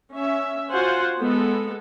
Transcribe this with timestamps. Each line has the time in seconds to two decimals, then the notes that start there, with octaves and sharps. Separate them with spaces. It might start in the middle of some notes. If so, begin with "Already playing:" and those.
0.13 C#4 E5
0.71 F4 F#4 C5 F#5 G#5
1.20 G#3 B3 A4